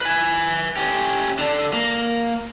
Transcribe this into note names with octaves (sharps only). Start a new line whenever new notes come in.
B4 G#5
C#4 G4
D3 D4
A#3